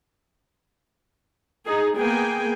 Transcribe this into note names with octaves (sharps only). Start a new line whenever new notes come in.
D#4 G#4
A#3 B3 G#4 G5 G#5